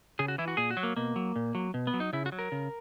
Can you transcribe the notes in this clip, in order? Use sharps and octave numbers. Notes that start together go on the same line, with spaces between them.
C#3 G#4
F#4
E3 E4
F#4
A#2 G#4
F#4
F#3
A#3
B2 A#3
F#3
A#2
F#3
B2
B3
F#3
D#4
C#3 E4
F#4
F#3
A#4
C#3